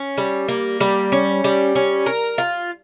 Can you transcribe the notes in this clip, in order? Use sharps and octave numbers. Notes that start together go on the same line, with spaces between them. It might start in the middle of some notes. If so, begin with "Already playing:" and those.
Already playing: C#4
G3
A#3
G3
C#4
G3
C#4
A#4
F4